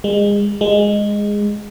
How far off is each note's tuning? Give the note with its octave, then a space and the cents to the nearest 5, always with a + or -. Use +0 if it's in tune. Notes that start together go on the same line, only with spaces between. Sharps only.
G#3 -30
G#3 -10